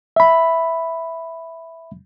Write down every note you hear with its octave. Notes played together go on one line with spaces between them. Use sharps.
E5 B5